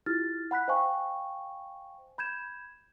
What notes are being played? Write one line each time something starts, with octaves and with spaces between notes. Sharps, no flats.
E4 F4 G4 F6 A6
F#5 B5 F#6 B6
C5 D#5 F5 G5 G#5 C#6
B5 G6 G#6 E7